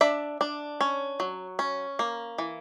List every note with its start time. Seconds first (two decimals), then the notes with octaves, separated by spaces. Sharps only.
0.01 D4 E5
0.41 D4
0.81 C#4
1.20 F#3
1.59 C#4
1.99 A#3
2.38 E3